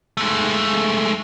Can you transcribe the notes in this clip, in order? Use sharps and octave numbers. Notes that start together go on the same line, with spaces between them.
G#3 A3